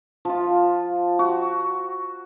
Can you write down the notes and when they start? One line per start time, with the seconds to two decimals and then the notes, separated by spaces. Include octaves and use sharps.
0.25 F3 F4
1.19 F#4